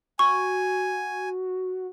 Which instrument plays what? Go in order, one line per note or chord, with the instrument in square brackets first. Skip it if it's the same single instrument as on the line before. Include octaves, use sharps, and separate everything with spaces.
[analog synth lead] F#4 [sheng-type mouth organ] G#5 [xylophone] C#6